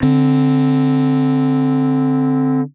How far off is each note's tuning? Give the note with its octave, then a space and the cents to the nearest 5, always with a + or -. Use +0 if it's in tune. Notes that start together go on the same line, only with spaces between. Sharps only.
D3 -10 C4 +0